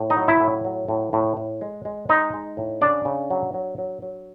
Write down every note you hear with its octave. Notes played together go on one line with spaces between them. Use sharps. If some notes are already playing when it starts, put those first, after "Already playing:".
Already playing: A2
D#4 D#5
F#3
E4 E5
A2
F#3
A2
A2
A2
G#3
G#3
G#3 D#4 D#5
G#3
A2
C#3 D4 D5
C#3
F#3
F#3
F#3
F#3